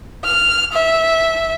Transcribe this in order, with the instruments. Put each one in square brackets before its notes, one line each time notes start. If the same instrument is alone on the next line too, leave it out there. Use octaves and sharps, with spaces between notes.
[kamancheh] F6
E5